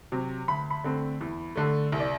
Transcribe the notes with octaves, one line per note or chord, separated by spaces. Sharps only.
C3 F#3
D2 B5
B5
D3 A3 C4
E2
D3 A3
C2
D5